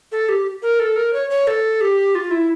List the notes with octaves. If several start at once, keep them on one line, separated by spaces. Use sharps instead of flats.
A4
G4
A#4
A4
A#4
C#5
C#5
A4
G4
F4
E4